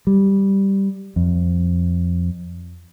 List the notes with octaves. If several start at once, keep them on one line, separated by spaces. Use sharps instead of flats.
G3
F2